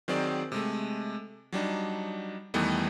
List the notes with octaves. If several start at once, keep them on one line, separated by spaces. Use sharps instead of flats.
D#3 F#3 C4 G#4 D5
C3 G#3 A3
F#3 G3 D4 D#4
E2 D#3 E3 G3 A3 B3